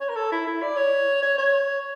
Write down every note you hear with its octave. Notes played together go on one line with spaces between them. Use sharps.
C#5
A#4
A4
E4
E4
D5
C#5
C#5
C#5